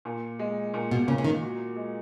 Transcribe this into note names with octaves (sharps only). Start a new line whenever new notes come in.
A#2
G#3
A#2
B2
A#2 C#3
C#3
D#3
F#4
G#3